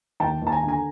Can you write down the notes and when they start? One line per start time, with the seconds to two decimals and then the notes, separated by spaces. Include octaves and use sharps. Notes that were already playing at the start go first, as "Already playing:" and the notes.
0.20 D#2 G5 A5
0.42 D#2 A5
0.52 G#5 A#5
0.63 D3
0.68 G#5 A#5